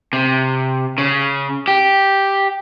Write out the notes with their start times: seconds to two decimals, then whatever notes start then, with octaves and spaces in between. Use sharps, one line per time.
0.13 C3
0.98 C#3
1.68 G4